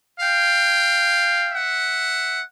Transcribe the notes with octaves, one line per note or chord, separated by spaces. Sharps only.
F5 G5
E5 F#5